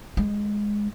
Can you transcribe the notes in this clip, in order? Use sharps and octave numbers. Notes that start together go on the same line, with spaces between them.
G#3